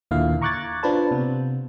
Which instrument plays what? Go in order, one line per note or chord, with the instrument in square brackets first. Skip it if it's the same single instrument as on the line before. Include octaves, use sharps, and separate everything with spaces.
[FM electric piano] D#2 A#2 D3 E4 F5
A#5 C#6 D6 F#6 G#6 A6
D4 F4 B4 C5 A5
C3 B3